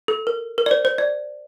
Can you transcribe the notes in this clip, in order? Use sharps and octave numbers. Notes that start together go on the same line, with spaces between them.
A4
A#4
A#4
D5
C5
C5
D5